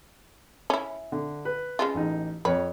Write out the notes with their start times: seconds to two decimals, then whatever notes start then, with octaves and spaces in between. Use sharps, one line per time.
0.70 C#4 E4
1.12 D3
1.45 B4
1.79 C#3 G#3 F4
1.95 A1 D#4
2.45 F2 B4 C#5